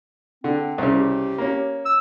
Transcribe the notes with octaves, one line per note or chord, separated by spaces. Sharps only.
D3 C4
C2 C#3
G4
A#3 C#4
E6